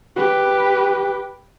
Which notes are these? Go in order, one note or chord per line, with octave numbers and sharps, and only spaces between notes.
G4 B4